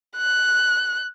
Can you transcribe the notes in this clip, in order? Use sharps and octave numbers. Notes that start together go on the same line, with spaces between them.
F#6